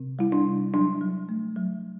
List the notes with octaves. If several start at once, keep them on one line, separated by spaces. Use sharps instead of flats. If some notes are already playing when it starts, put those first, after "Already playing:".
Already playing: C3 C4
G3 E4
D4
C3
F#3 D4
F#3
A3
F#3